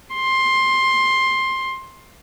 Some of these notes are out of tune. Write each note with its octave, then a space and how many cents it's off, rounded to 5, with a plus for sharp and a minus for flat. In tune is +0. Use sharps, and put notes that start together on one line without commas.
C6 +15